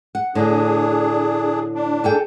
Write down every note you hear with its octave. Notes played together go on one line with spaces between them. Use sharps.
F#5
A2 D3 D4 G#4
D4
G#4 A4 G5